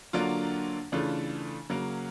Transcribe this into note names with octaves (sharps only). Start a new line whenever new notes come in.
D3 F#3 A#3 D4 F4
C#3 E3 A3 D4 F4
C#3 F#3 A#3 C#4